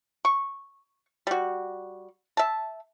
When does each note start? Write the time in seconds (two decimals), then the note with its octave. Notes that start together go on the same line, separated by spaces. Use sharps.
0.25 C#6
1.27 G3 F#4
2.37 E5 A5